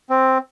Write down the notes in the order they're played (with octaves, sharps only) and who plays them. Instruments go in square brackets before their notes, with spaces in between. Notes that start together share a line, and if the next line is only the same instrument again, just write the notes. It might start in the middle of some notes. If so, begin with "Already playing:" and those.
[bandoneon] C4